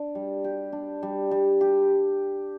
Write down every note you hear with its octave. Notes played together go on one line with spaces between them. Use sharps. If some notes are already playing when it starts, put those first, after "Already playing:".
Already playing: D4
G3
G4
D4
G3
G3
G4